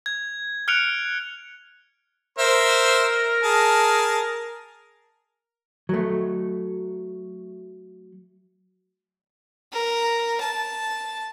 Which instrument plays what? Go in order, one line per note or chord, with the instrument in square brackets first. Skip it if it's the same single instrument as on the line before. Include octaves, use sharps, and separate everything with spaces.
[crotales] G#6
F6 F#6 C#7 D7 F7
[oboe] A#4 [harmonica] C5 E5
[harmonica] G#4 A5
[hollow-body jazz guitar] F#3 A3
[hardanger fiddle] A#4
A5